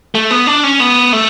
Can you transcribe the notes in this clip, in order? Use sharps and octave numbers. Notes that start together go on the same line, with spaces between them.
A3
B3
D4
C#4
B3
A3